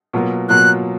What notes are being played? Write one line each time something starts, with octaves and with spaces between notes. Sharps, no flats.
B2 F#3 A#3 F4
B2 F#3 A#3 F4 F#6